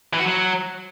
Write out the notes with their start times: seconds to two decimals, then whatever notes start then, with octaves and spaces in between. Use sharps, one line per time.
0.14 E3
0.19 F#4
0.25 F#3